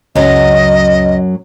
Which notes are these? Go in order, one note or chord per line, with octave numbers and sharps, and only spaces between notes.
C#2 F#2 C#3 F#3 D#5